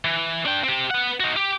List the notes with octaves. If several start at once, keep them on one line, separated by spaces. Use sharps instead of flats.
E3
D4 G5
C4 G4
B4 F#5
D#4 F#4
G4